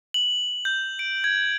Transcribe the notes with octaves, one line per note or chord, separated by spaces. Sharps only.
F#7
G6
D7
G#6